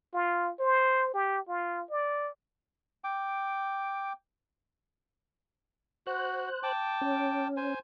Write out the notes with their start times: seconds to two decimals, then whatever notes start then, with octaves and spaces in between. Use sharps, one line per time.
0.14 F4
0.59 C5
1.14 G4
1.48 F4
1.90 D5
3.04 G5 D6
6.07 F#4 C5 F#6
6.63 G5 A5 D6
7.01 C#4
7.57 C5 G#5